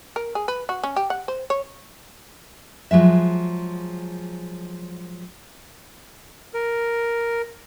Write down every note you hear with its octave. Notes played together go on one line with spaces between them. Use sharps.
A#4
G#4
B4
F#4
C#4
G4
F#5
C5
C#5
F3 F#3 G#3 E5
A#4